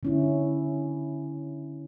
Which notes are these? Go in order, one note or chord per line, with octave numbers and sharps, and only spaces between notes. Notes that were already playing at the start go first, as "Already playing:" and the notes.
D3 C#4 E4